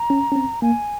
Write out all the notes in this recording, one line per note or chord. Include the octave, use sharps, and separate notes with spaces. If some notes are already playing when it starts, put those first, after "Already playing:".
Already playing: A#5
C#4
C#4
C4
A#3 G#5